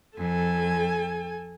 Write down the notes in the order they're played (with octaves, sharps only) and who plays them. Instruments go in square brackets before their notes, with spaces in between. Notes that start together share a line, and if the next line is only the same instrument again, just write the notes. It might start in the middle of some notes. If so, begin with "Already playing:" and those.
[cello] F2 [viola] A4 G#5